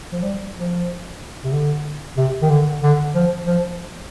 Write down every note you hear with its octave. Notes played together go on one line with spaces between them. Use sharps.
F3
G3
F3
C3
D3
C3
D#3
D3
D3
F3
F3